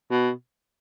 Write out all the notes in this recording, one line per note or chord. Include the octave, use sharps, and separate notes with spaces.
B2